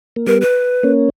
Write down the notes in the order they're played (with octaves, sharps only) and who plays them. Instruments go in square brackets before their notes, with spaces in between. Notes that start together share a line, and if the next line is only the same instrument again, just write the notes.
[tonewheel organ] A#3
[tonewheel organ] G3 B3 [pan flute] A#4
[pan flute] B4
[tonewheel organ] A#3 C#4